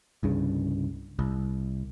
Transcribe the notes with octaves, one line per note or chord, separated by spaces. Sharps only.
C2 G2 C#3
C2